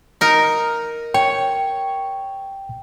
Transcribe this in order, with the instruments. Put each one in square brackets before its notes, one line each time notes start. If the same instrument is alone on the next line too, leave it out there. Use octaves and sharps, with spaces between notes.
[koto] D#4 A#4
[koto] C#5 [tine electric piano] G5